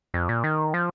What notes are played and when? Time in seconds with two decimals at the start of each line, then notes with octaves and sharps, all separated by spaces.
0.14 F2
0.29 A#2
0.44 D#3
0.74 F3